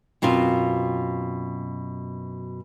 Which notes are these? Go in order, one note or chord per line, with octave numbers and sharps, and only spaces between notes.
F#2 B2 C4 F4